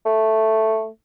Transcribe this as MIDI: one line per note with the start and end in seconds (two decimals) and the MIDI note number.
0.06 0.87 57